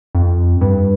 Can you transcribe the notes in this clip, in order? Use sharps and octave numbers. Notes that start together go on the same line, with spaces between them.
F2
G2